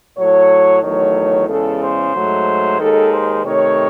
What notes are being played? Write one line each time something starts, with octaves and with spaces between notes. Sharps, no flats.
A2 F#3 A3 C#5
E2 D#3 F#3 A3 C#5
E2 C#3 G#3 A4
C5
G#2 F#3 A3
D#2 D#3 G#3 A4
C5
C3 D#3 A3 C#5